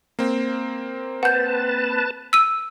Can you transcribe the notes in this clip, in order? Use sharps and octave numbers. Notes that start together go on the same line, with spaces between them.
A#3 C4
B4 F#5 A5 G6
E6 D#7